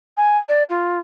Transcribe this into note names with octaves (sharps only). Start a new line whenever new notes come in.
G#5
D5
F4